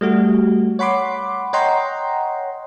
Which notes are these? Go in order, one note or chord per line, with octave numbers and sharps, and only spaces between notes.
G3 A3 F#4
C#5 F#5 B5 C6 D6
C#5 D#5 F#5 G5 A#5 C6